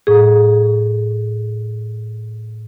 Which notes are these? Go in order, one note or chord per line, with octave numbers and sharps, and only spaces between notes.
A2 G#4